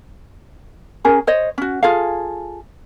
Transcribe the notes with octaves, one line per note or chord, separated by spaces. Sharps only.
C#4 G#4 A#4
C5 C#5 D#5
C#4 F#4
F4 G#4 A4 F5